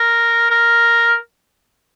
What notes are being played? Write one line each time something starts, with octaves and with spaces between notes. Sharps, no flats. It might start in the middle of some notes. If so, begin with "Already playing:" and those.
Already playing: A#4
A#4